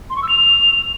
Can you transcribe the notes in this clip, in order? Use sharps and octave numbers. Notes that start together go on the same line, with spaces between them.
C6
C#6
E6
F7